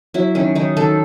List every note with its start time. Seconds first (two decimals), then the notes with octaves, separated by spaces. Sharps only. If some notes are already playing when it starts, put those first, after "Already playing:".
0.14 F#3 E4
0.35 D#3 C#4
0.55 D#3 D#4
0.77 D#3 A4